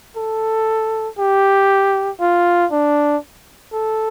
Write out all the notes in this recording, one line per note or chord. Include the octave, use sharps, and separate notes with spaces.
A4
G4
F4
D4
A4